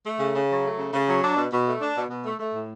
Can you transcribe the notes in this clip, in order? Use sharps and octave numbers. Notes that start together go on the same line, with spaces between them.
A3
C#3
C#3
F#3
A3
C#3
C#3
F#3
D4
B2
B2
A3
D4
B2
B2
A3
A3
A2